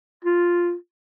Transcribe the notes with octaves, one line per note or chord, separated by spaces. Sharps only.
F4